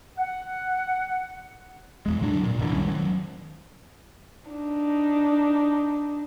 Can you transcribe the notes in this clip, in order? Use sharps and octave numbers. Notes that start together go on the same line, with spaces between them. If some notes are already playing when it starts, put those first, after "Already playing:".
F#5
E2 G#3
A2 D3 F#3 D4
A#2
C2 F#2 D3 E3
D#3 G3 C#4
D#3 F#3
D4 D#4